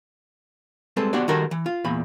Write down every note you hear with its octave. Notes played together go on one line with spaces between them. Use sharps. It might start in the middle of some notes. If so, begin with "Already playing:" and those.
G3 G#3 C4 A4 B4
B3 D4 F#4 G4 C5 D5
D#3 G3 F#4 A4 A#4 C5
E3
F4
E2 A#2 B5